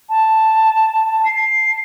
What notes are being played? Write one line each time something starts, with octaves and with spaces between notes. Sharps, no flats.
A5
C7